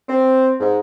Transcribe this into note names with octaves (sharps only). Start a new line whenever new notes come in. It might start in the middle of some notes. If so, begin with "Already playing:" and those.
C4
G#2